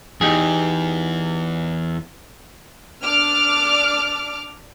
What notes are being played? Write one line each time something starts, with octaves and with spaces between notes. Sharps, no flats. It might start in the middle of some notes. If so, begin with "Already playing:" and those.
E2 E3 D#4 G4 G#4
D4 D6 F6